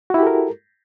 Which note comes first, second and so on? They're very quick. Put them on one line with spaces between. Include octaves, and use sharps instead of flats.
F#4 E4 G4 A4 A#4